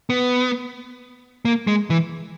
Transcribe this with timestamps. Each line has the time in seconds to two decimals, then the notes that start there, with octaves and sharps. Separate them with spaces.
0.10 B3
1.45 A#3
1.67 G#3
1.90 E3